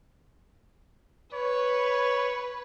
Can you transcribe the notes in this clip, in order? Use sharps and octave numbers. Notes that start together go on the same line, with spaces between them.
B4 C#5